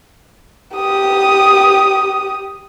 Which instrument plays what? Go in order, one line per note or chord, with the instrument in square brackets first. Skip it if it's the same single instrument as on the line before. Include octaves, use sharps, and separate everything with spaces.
[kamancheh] G4 D#6